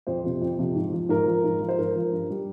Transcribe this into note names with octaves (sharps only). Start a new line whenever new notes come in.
F2 C5
C3 F3
F2
C3 F3
G#2
F3
G#2 A#4
F3
G#2
F3
C5
G#2 A#4
F3
G2
G3